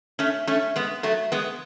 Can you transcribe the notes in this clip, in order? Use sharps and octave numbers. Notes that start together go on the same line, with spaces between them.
A3 C#4
A3 C#4
G#3 B3
F#3 A3
G#3 B3